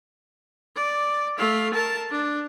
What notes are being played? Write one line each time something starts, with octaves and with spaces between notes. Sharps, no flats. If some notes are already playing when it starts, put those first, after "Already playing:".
D5
A3 F5
A#4 A5
D4